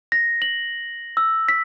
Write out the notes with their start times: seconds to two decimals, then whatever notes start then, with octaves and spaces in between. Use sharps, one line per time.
0.12 A#6
0.42 F#7
1.17 E6
1.49 B6